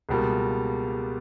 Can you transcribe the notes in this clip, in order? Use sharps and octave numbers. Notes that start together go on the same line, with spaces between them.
C#2 B2 G3 A#3